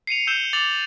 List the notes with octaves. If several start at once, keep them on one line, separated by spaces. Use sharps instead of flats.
C7 C#7 D#7 F7
E6 G6 C7 E7 G7
D6 E6 A6 F7 F#7